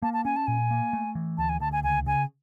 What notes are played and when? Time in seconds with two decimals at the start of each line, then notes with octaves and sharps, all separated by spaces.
0.02 A#3 A5
0.13 A5
0.25 C#4 G#5
0.36 A5
0.47 A#2 G#5
0.71 A#3
0.93 A3
1.15 E3
1.38 D2 A5
1.49 G#5
1.60 D2 A5
1.72 G#5
1.84 C#2 G#5
2.06 C#3 G#5